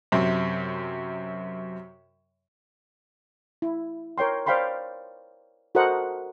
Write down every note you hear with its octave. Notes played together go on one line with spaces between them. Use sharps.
F#2 C3
E4
A#4 C#5 G5 C6
C5 D5 F5 G5 B5 C6
F#4 A4 A#4 C5 D#5 F#5